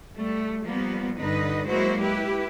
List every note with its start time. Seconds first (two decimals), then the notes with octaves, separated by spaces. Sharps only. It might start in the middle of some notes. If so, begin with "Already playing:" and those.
0.15 G3 A3
0.63 F3 G3 A#3 B3
1.18 G2 D3 D#4 B4 D#5
1.67 F#3 G#3 A#3 E4 F#4 C5
1.98 E4 G4 B4